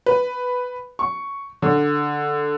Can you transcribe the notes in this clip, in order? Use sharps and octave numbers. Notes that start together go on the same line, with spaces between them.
B4
C#6
D3